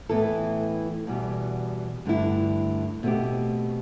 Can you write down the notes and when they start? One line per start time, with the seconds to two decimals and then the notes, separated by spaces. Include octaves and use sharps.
0.09 A2 E3 B3 E4 A4
1.07 E2 B2 G3
2.05 G2 D3 A3 E4
3.03 B2 A3 C4 G4